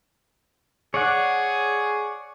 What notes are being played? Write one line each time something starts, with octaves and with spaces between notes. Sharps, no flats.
G#4 C#5 D5 F#5